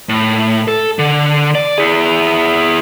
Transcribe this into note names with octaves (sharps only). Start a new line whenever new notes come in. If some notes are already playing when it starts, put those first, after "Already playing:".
A2
A4
D3
D5
E4 G#4